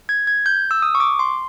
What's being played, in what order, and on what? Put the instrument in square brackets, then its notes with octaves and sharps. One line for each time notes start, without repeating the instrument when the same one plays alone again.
[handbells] G#6
G#6
G6
E6
D#6
C#6
D6
C6